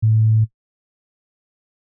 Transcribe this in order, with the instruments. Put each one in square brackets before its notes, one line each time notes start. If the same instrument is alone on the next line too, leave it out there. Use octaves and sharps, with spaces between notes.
[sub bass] A2